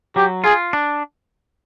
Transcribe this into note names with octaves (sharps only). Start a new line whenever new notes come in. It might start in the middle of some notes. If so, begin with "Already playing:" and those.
F#3 G4
F4 G#4
D4